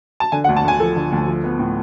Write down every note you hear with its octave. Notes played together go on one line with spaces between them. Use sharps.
A5
D3 G#5
F#5
D2
A5
D2 G#5
F3 A4
D3
D2
F3
B3
A2